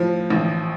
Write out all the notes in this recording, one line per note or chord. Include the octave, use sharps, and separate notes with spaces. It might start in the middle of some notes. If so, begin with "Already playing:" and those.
Already playing: A2 F3
A1